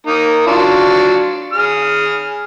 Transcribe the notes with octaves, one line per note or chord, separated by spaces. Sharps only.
A#3 D#4
F#3 D4 F4
G#4 F6